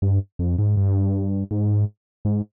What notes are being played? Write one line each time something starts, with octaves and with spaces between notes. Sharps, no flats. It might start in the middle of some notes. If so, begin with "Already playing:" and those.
G2
F2
G#2
G2
G#2
G#2